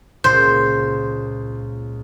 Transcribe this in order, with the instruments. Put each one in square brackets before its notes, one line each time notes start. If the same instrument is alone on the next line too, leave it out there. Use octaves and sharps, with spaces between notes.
[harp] C#2 A#2 [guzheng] C5